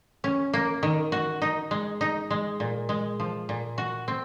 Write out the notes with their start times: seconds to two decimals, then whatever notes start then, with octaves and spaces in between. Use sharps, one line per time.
0.24 C#4
0.53 A#3
0.83 D#3
1.12 F#4
1.42 D#4
1.71 G#3
2.01 D#4
2.30 G#3
2.60 A#2
2.89 G#3
3.20 F3
3.49 A#2
3.78 F#4
4.08 C4